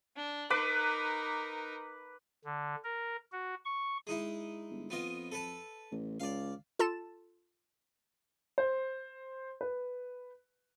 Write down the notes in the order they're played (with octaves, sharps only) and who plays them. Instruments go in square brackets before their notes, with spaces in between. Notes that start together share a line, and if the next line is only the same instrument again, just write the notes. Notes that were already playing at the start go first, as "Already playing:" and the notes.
[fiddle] D4
[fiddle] D#4 A#4 [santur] B4 D6
[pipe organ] D3
A#4
F#4
C#6
[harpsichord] G#3 D#4 E4
[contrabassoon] G1
[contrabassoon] F2 [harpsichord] B3 F4 D#5
[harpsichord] A4 B4 A5
[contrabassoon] A1
[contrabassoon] C#2 [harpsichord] D5 F5
[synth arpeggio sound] F4 A4 A5 A6 E7
[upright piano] C5
B4